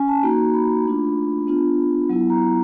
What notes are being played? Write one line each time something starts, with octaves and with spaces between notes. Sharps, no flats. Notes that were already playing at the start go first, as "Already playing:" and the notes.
Already playing: C#4 G#5
A5
A#3 D#4 F#4 A#5
B5
A3 D4 F4
B3 D4 F4
F#3 B3 E4
A#5